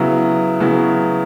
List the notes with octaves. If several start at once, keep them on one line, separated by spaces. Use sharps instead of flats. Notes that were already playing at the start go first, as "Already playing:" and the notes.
Already playing: C#3 F#3 B3 E4
C#3 F#3 B3 E4